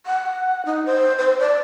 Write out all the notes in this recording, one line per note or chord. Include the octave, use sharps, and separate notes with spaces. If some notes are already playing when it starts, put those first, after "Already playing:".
F#5
D#4
C5
C5
D5